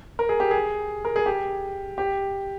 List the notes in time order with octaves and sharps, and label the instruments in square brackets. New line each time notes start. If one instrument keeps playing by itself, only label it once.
[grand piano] A#4
G#4
G4
G#4
A#4
G#4
G4
G4